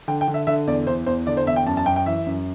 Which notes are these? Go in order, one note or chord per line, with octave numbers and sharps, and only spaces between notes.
D3 G5
G5
D3
E5
D3 E5
E2 D5
E2 C5
E2 C5
D3 D5
C5
E2 E5
G5
F#2 A5
A5
F#2 G5
G5
E3 E5
F#2